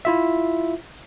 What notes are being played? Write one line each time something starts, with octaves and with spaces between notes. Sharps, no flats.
E4 F4 E5